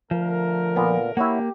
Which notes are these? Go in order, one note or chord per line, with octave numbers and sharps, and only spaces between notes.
D3 F3 A3 A#4
A#2 B3
A#3 E4 G4 C#5 F#5